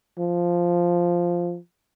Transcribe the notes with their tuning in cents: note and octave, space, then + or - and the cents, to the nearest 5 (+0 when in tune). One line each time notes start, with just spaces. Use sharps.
F3 -5